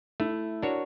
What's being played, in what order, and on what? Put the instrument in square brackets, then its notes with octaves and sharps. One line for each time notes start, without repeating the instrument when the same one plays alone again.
[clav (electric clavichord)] A3 [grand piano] E4
[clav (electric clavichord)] D4 F#4 A#4 C#5